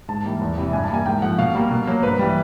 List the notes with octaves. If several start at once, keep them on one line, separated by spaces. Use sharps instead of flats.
G#2 A5
E3 G3 A#3
E2
C3 E3 G3
G2 G#5
A5
E3 G3 A#3 G#5
G#2 G5
F3 A3 F#5
B2 F5
G3 A#3
B2
F#3 A#3
G2 B4
E3 G3